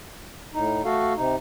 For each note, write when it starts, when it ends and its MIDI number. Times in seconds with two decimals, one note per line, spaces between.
0.54 0.82 45
0.54 0.82 63
0.85 1.13 57
0.85 1.13 66
0.85 1.13 69
0.85 1.13 77
1.16 1.36 48
1.16 1.36 63